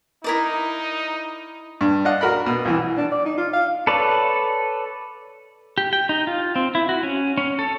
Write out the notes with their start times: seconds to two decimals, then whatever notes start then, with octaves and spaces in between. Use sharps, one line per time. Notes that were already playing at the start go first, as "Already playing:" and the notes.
0.24 D#4 E4 A#4 D5
1.81 G2
2.05 D4 D#5 F5 F#5
2.21 F#4 A#4 B5
2.46 B2
2.65 C2 E3
2.97 D4
3.12 D5
3.26 D#4
3.37 F4
3.53 F5
3.87 A4 B4 C#5 D5
5.78 G4
5.93 G5
6.09 D#4
6.27 F4
6.56 C4
6.75 E4
6.89 F#4
7.03 C#4
7.38 C#4
7.59 A4